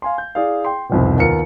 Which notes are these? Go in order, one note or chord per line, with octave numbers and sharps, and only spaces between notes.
F5 G#5 C6
G6
E4 G#4 D5 F5
G5 C6
C2 F2 G#2 B2
D#2 B3 F4 A#4 C#7